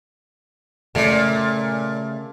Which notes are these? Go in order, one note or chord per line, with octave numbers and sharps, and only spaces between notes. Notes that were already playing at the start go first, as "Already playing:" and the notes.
A#2 C#3 A3